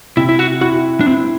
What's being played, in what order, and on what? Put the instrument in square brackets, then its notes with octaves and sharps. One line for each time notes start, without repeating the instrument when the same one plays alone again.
[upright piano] C3 [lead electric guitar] E4
[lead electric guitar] E4
F#4
[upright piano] E4 [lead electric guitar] F#4
[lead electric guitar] D4
[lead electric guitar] C4 [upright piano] E4